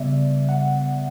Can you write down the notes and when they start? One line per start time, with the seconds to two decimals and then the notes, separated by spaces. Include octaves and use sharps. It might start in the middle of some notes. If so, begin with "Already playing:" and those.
Already playing: C#3 G3 B3 D5 E5
0.49 F#5